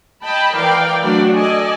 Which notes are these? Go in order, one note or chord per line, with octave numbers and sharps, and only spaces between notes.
D#5 G5 A5 B5
E3 A#4 D5 F5 G5
F#3 A3 D4 F#4 D5
A4 D5 D#5 G#5